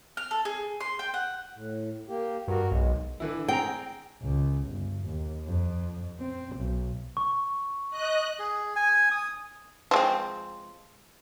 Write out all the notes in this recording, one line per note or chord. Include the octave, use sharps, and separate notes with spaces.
F6
A4
G#4
C6
G5
F#5
A2
A#3 G4
G2 F#4 A#4
B1 G#3
D3 E3 E4
C4 G#4 G5 A#5
C#2
G1
D#2
F2
C4
B1
C#6
D#5 F#6
G#4
G#5
D#6
F3 G#3 C4